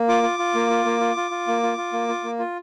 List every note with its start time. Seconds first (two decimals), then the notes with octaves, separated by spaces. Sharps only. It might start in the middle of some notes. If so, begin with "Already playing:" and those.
Already playing: A#3
0.08 F4 D6
0.23 F4
0.39 F4
0.55 A#3
0.70 F4
0.85 A#3
1.00 F4
1.17 F4
1.31 F4
1.48 A#3
1.63 F4
1.78 F4
1.93 A#3
2.09 F4
2.24 A#3
2.39 F4